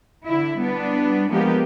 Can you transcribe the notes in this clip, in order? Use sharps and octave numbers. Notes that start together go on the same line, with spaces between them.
D3 E4
G3 B3 D4
F3 G#3 A#3 B3 G4